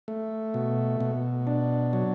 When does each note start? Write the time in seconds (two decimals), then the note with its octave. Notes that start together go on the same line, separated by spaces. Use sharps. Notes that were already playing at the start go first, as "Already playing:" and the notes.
0.08 A3
0.54 B2
1.00 B2
1.47 D4
1.93 F#3